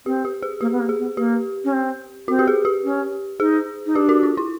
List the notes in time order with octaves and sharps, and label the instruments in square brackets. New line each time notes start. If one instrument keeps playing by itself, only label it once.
[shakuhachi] C4 [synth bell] G4
[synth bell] G4
G#4
[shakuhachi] A#3 [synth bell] G4
[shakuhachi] B3
A#3
[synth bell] G#4
[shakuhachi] B3
[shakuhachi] A#3 [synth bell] G4
[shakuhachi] C#4
C4
[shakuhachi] C4 [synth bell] F#4
[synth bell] G4
G#4
G4
[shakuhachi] C#4
[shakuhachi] D#4 [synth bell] G#4
[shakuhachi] D#4
[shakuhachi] D4 [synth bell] G4
[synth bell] F#4
F4
E4